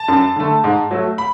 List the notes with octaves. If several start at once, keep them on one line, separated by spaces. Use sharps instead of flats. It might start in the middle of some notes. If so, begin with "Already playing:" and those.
Already playing: A5
F#2
D3 A3
G#2
F#3 A3
B5